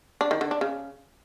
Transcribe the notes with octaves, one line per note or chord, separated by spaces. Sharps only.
D4
D#3
D3
D4
C#3